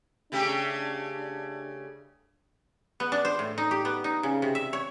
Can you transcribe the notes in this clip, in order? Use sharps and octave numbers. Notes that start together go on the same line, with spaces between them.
C#3 A3 D4 G4
B3
D4
C5
A2
D#4
G4
B3
D#4
C#3
C3
E5
C#5